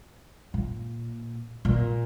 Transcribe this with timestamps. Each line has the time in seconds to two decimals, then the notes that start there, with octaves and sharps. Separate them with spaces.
0.54 A#2
1.65 A#2